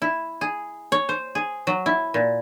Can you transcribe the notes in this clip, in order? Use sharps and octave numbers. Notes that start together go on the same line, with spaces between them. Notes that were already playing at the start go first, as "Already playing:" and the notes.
E4
G#4
C#5
C5
G#4
F#3
E4
A#2